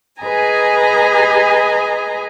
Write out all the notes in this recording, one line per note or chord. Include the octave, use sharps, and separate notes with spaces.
G#4 B4 D#5 G#5 A#5